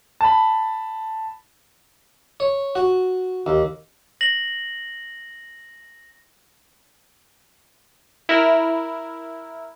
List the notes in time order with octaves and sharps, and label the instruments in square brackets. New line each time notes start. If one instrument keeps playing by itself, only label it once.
[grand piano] A5 B5
[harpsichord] C#5
F#4
D#2
[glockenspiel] A#6 F#7
[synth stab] E4 A#4